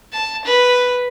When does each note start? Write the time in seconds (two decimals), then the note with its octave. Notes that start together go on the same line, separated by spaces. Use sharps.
0.13 A5
0.45 B4